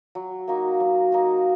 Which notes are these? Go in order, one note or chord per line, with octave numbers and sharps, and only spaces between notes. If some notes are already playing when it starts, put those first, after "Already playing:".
F#3
A#3 D#4 F#4
F#3
A#3 D#4 F#4